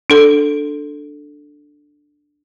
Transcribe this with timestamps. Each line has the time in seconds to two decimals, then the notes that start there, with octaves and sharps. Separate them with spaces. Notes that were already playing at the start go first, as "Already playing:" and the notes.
0.10 D4 A4